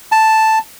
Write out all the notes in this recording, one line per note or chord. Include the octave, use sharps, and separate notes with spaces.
A5